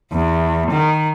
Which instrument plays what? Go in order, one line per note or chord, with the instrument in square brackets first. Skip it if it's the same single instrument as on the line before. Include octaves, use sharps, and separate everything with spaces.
[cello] E2
D#3